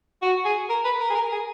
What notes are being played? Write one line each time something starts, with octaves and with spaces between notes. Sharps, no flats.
F#4
G#4
A#4
B4
A#4
G#4
A#4
G#4